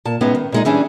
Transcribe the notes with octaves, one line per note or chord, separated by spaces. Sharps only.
A#2 A5
A2 G#3 B3 C#4 D#4
D#3
A#2 G#3 D#4
E3 G3 C#4 D4 G#4